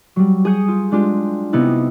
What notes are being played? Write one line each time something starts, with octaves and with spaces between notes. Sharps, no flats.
F#3 G3
G#4 D#6 G6 C#7
F4
G#3 D4 F4 G4
C3 B3 D#4 E4